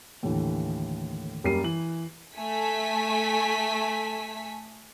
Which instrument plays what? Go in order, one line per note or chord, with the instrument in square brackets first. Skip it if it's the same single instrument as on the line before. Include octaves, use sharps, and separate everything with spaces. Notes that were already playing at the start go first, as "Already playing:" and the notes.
[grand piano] D#2 A2 D3 E3
F#2 G3 A#3 C7 D#7
E3 F#7
[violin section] A3 G#5 B6